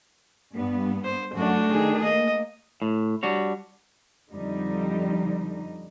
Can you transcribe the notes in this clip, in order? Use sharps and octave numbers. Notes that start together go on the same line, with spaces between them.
G2 B3
C5
F#2 A3 D4 F#4
D#3 G#4
A#3 D#5
A2
G3 D4 F#4 C#5
F2 D3 G3 D#4